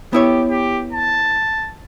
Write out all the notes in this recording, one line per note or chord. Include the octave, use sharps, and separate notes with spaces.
B3 E4 G4 C#5
G4
A5